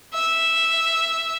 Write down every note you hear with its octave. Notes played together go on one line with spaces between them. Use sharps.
E5